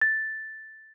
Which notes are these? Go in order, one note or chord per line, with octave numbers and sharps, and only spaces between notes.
A6